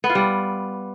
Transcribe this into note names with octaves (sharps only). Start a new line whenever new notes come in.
B3
F4
G3